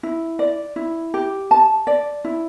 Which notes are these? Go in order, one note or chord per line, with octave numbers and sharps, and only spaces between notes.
E4
D5
E4
G4
A5
D5
E4